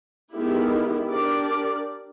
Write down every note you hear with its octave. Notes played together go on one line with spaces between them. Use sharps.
D#3 G#3 B3 E4 G4
D4 G4 A#4 D5